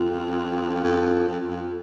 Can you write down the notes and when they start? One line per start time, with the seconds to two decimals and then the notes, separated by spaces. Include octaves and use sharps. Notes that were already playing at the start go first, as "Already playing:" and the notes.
Already playing: F2 F4
0.83 F2 F4
1.28 F2
1.48 F2